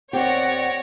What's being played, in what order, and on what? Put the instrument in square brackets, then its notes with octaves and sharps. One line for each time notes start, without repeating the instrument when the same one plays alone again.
[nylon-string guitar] D#2 C4 G4 [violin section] C#5 D5 A#6 [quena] F#5